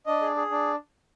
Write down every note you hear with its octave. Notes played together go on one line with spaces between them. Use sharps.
D4 D#5
G#4
G#4
D4